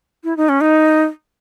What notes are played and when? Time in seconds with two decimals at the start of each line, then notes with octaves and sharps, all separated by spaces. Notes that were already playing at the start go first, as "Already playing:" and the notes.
0.24 E4
0.37 D#4
0.49 C#4
0.61 D#4